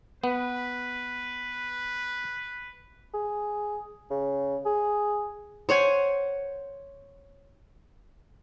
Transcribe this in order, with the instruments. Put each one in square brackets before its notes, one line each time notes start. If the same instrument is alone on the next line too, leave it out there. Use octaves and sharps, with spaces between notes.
[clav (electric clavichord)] B3 [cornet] B4
[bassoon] G#4
C#3
G#4
[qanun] C5 C#5 F#5 G#5